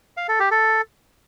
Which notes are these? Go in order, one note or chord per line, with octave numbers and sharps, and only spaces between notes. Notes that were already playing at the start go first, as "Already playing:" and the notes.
F5
A4
G4
A4